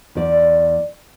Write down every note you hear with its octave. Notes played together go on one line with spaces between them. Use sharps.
E2 D5